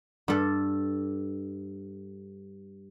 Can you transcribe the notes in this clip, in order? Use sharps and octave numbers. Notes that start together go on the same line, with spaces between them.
G2 A4